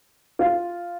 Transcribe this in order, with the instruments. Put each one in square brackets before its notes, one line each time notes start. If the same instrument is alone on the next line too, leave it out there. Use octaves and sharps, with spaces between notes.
[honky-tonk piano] F4